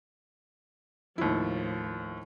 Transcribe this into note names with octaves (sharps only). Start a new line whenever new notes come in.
D#2 A2 F3 E4